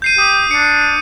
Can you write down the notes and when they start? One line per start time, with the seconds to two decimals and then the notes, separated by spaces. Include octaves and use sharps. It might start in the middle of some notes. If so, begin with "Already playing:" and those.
0.02 G6 C7 D#7
0.18 G4 D#6
0.51 D4 C#7